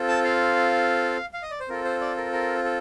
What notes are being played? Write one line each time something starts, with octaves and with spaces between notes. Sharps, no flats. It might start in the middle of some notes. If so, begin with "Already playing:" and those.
Already playing: C4 F4 A4
A5
F5
F5
D#5
D5
C5
C4 F4 A4 A#4
C5
D5
A#4
A#4
A4